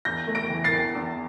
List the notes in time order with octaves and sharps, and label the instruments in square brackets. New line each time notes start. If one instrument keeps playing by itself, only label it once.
[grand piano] E2 G6 A#6
A3
A#6 D7
E3
A6 C7
E2
E2